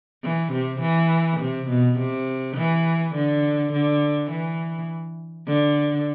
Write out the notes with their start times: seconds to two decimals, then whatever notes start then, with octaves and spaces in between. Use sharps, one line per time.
0.24 E3
0.53 C3
0.81 E3
1.41 C3
1.69 B2
1.99 C3
2.57 E3
3.15 D3
3.73 D3
4.31 E3
5.47 D3